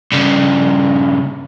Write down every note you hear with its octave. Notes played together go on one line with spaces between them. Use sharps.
G2 C#3